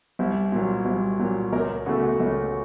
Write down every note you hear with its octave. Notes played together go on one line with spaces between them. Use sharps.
C2
A#2 F#3
C2
A#2 F#3
C#2 A#4
C#3 A3 F#4
F#4
C#2